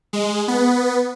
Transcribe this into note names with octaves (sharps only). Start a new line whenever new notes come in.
G#3
B3